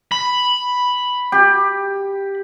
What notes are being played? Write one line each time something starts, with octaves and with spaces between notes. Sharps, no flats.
B5
G4